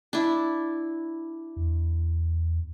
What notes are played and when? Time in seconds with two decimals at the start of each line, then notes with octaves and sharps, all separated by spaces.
0.13 D4 E4
1.57 E2